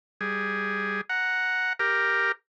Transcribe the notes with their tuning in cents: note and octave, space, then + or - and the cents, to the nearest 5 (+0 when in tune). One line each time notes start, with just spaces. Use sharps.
G3 +0 G#4 +0
F#5 +0 A#5 +0
G4 +0 A#4 +0